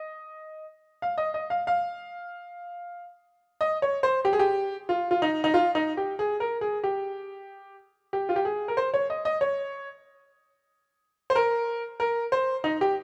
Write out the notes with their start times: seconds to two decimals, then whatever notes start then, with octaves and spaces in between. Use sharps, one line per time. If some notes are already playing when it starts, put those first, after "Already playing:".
Already playing: D#5
1.02 F5
1.18 D#5
1.34 D#5
1.50 F5
1.67 F5
3.61 D#5
3.82 C#5
4.03 C5
4.25 G4
4.33 G#4
4.39 G4
4.89 F4
5.11 F4
5.22 D#4
5.44 D#4
5.54 F4
5.75 D#4
5.97 G4
6.19 G#4
6.40 A#4
6.61 G#4
6.84 G4
8.13 G4
8.29 F4
8.36 G4
8.45 G#4
8.68 A#4
8.77 C5
8.94 C#5
9.10 D#5
9.25 D#5
9.41 C#5
11.30 C5
11.35 A#4
12.00 A#4
12.32 C5
12.64 D#4
12.81 G4